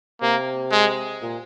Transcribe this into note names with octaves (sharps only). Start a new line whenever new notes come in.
C3 A#3
G#3
A#2